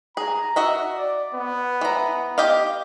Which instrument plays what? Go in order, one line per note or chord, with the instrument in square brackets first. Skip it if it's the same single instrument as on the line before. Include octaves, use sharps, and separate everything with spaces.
[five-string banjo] G#4 [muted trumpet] A#5
[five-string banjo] F#4 D#5 E5
[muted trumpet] D5
B3
[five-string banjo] E3 A#5
G4 D#5 F5